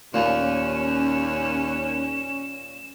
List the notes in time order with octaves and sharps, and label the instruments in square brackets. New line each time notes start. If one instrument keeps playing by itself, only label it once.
[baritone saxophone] D#2 [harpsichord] A#2 [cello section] C#4 [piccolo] E7